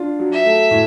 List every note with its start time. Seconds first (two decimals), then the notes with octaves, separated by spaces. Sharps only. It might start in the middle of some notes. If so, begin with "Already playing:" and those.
Already playing: D4 F4
0.19 F#3
0.32 E5
0.45 A3
0.71 A2